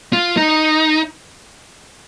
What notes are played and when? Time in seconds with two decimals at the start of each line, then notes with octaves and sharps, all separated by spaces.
0.13 F4
0.37 D#4